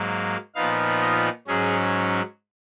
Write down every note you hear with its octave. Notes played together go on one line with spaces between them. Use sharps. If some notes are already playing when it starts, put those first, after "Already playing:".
Already playing: G#2 F#3 A#3
A#2 F3 B3 D#4 F5
D#5
G#2 F#3 C#4 G#4